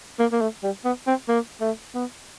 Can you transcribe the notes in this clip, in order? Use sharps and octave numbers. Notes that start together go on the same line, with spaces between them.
A#3
A#3
A3
G3
B3
C4
A#3
A3
B3